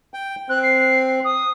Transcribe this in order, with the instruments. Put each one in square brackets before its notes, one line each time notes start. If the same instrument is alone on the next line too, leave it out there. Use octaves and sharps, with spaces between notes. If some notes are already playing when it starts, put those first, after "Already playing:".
[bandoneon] G5
[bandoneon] C4 [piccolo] F#6
[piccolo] C7
D#6